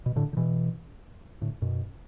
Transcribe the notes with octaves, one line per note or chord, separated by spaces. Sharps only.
B2
A2 D3
D3
B2 E3
A2 D3
F#2 B2